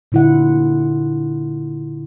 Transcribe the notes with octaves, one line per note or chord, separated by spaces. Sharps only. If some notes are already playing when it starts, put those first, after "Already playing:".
A#2 D3 E4 F4 F#5